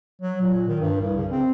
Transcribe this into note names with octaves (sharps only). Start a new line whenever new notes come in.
F#3
A#2
D#3
G2
C2
C#3
C4